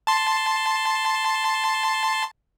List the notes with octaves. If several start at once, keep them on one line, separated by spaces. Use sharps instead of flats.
A5 C6